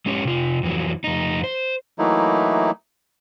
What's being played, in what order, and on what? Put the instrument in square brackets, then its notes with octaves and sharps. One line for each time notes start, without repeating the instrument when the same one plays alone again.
[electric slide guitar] G#3 C#4 G4 C#5
C3 F4
F2 E3 F#3
F2 D#4
C5
[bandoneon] E3 F#3 A3 A#3 D#4 E4